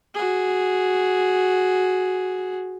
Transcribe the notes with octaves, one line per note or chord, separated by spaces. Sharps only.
F#4 G#4